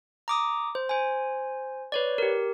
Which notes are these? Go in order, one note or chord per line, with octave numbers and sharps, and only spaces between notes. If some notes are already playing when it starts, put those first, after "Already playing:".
A#5 D6 D#6
C5
C5 G#5
B4 C#5 D5
G4 A#4